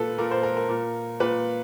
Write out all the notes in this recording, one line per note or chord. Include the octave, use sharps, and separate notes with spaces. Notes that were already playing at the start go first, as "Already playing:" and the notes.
Already playing: A#2 A4 B4
A#2 A#4
C5
A#4
A#4
A#2
A#2 B4